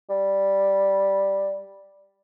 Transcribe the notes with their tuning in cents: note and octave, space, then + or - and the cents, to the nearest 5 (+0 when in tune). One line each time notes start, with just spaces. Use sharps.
G3 +0